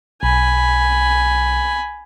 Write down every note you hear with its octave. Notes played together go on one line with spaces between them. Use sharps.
B1 G#5 B5